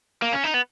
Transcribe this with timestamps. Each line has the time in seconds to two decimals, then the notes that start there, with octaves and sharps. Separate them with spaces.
0.22 A#3
0.33 C#4
0.44 D#4
0.54 B3